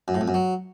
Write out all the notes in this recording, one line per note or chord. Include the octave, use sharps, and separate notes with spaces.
F#2
A2
F2
F#2
F#3